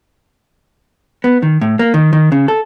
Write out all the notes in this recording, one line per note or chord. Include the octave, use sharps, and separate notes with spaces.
B3
D#3
A2
A#3
D#3
D#3
C#3
A4